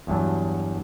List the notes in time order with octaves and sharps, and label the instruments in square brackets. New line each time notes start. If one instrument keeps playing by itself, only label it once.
[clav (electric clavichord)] E2 G2 F#3 A5